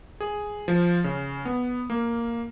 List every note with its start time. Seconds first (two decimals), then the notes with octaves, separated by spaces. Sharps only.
0.20 G#4
0.68 F3
1.04 C#3
1.45 B3
1.90 A#3